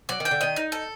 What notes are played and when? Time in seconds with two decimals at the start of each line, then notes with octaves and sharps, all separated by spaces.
0.09 F#3 D5
0.20 D#3
0.25 G5
0.31 D3
0.41 D#3 D#5
0.56 D#4
0.72 A4